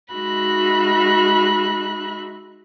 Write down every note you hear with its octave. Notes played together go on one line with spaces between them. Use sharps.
G#3 D#4 F#4 E5 B5 F#6